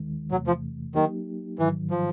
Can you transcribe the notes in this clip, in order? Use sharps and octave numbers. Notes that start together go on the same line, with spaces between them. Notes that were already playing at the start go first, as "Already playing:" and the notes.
Already playing: D#2 D#3 G#3
E2 C3 E3 F#3 A3
F3
D#3 F#3 A#3 D#4 G4
G#2 D#3 E3 F#3
F3